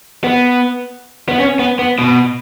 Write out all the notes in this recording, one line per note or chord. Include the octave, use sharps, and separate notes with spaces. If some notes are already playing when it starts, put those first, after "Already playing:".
B3
B3
C#4
B3
B3
B2